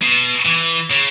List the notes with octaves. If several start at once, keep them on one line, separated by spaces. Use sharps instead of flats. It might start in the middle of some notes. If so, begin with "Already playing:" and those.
B2
E3
C#3